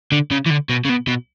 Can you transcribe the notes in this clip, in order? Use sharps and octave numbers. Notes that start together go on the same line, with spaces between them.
D3
C#3
E3
D3
B2
C#3
B2
B2